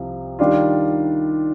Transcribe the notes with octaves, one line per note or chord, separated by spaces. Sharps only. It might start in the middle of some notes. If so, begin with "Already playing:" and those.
Already playing: C2 C3 F3
D#3 G3 D4 F4